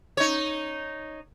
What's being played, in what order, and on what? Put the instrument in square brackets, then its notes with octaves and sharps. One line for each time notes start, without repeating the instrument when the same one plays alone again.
[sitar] D#4 C#5